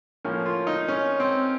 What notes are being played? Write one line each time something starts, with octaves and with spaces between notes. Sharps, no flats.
A2 F3 A#3 C#4
F4
D#4
C#4
C4